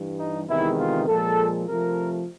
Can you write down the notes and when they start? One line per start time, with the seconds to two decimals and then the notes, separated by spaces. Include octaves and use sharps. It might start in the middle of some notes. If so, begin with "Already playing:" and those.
Already playing: G2 E3 G3
0.17 D#4
0.48 E2 C3 D#3 G#3 E4
0.77 F4
1.07 A#2 F3 G#3 A4
1.66 C3 F3 A3 A#4